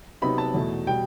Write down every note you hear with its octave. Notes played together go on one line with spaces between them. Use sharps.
C3 F#3 B3 D#4 B5
A5
E2 B2 A3
B2 G3 G5